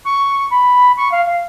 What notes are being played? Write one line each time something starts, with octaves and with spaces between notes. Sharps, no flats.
C#6
B5
C#6
F5
F5